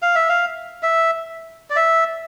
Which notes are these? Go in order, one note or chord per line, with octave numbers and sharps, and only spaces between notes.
F5
E5
F5
E5
D5
E5